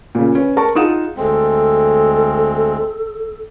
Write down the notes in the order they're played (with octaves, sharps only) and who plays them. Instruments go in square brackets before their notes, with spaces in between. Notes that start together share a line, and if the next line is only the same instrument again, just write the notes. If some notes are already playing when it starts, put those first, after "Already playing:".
[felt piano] A#2 C#3
C#4 B4
A#4 A5 C#6
D#4 F4 G#4 F#5 D#6 E7
[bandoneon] D2 G#3 C4 [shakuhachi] A4